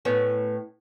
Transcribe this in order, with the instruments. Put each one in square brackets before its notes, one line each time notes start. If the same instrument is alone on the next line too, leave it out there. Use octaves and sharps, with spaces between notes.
[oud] A2 B3 C#4